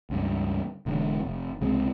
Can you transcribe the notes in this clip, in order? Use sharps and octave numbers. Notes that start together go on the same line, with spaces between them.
C#2 G2
E1 D3 G#3
F1
C#2 C3 G#3 C4